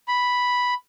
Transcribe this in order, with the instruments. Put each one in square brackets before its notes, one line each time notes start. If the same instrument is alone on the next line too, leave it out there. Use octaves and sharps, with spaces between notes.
[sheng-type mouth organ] B5